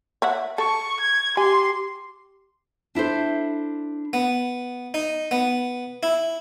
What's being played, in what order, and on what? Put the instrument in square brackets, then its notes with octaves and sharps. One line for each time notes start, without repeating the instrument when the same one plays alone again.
[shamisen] C#5 E5 F#5
[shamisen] A4 [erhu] C#6
[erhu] G#6
[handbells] G4 [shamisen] G#5 [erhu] C6
[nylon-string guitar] D4 E4 A4 C5
[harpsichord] B3
D#4
B3
E4